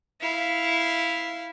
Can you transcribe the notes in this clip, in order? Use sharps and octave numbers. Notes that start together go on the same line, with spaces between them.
E4 F5